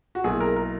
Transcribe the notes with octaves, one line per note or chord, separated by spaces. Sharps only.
F#4
B1 B2 A#3 E4 G#4
A#4
A#4